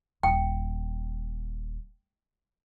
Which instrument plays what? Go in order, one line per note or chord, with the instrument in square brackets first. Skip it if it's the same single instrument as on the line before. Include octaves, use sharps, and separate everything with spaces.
[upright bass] D#1 [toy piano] G5